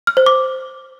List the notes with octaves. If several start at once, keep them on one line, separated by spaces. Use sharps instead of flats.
F6
C5
D6